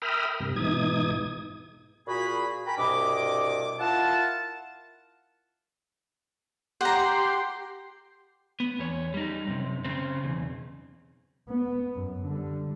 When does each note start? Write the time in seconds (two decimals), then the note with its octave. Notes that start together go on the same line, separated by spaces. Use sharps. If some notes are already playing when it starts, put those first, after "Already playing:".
0.02 A#4 E5 G5 B5 D#6 F6
0.40 G2 C3
0.56 G#2 B2 E3 D#4 D#6 G#6
2.07 A#2 F#4 G#4 B5
2.66 A#4 G5 G#5 A#5 B5
2.78 C2 G2 B2 D#5 D6
3.80 E4 F4 A#4 F#5 A5
6.81 G4 F#5 A#5 C6
8.60 B3
8.79 E2 C#5
9.14 G3 D#4
9.47 F#2 C3
9.85 C#3 C4
10.24 B1 E2
11.49 B3
11.94 F#2
12.25 D3 G3